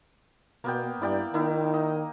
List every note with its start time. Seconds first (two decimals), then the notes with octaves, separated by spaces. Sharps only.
0.64 B2 A#3 B3 G5
1.02 G2 E4 D5 G5
1.34 D#3 A#3 D#4 E4
1.74 D#5